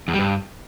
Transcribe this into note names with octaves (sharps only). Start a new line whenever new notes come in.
E2
G3
G2